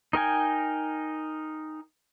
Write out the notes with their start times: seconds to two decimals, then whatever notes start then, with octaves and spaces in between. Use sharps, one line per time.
0.13 D#4 A#4 G5 G#5